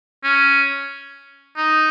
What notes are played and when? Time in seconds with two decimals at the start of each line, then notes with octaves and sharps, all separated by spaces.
0.24 C#4
1.57 D#4